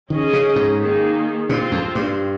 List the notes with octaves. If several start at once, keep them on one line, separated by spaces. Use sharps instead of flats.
D#3 C#4 G#4 D#5
C#3
G#2
D#3 A#3 D#4 G#4
A#2 C4 F4 C5
F2
G2